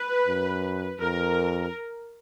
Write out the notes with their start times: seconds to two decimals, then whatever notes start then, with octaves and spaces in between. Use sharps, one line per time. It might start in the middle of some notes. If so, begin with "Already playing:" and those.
Already playing: B4
0.27 F#2
1.01 F2 A#4